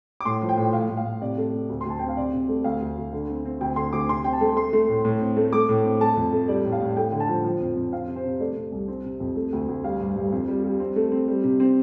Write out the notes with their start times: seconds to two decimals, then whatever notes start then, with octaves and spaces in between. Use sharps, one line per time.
0.20 D6
0.25 A2 C6
0.42 F3
0.49 G5
0.57 A2
0.73 A2 F5
0.89 A2
0.97 F5
1.05 A2
1.21 C3 D5
1.38 A3
1.54 C3
1.69 D2
1.81 C6
1.85 D2 A5
1.99 C4 G5
2.09 F5
2.17 C3 D5
2.33 C3
2.48 A3
2.64 D2 F5
2.81 D2
2.97 D2
3.13 D3
3.29 C4
3.45 C4
3.61 D2 G5
3.76 D3 C6
3.93 D2 D6
4.09 C3 C6
4.24 C4 G5
4.33 A5
4.41 A3
4.56 A3 C6
4.73 A3
4.89 A2
5.05 A2
5.20 C4
5.37 A3
5.53 A3 D6
5.69 A2
5.84 C4
6.01 A3 A5
6.17 F2
6.33 A3
6.48 G3 D5
6.64 A2
6.72 F5
6.81 A2
6.97 A3 G5
7.12 D3
7.20 A5
7.29 F3
7.44 F3
7.60 F2
7.76 F2
7.93 C4 F5
8.08 C3
8.16 C5
8.25 C3
8.40 A3 D5
8.56 C3
8.72 C2
8.88 C4
9.04 C3
9.20 F2
9.36 A3
9.53 D2
9.68 D2
9.84 G3 F5
10.00 G2
10.16 G2
10.32 F2
10.48 G3
10.64 G3
10.80 C4
10.96 A3
11.12 C4
11.28 G3
11.44 C3
11.60 C4